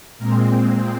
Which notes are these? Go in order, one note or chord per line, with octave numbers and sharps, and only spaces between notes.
A#2 G#3 C4 A#4